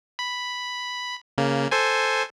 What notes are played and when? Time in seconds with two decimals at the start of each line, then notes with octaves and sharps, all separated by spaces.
0.19 B5
1.38 C#3 A#3
1.71 A4 C5 G#5